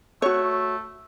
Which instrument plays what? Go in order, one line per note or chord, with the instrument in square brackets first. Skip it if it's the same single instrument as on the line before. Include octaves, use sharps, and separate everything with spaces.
[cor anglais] A3 [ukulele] F#4 C#5